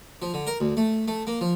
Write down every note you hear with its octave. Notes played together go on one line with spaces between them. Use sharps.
F3
D3
A#4
D2
A3
A3
A#3
F3